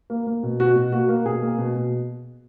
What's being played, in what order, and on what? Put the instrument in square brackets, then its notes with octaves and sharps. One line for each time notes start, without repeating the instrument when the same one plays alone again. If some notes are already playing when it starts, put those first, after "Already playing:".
[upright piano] A#3
A#3
B2
B2 F#4
B2
A#3 F#4
A#3
B2 G#4
A#3
B2
B2